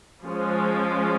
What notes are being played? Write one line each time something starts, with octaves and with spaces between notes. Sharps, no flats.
F3 G#3 C#4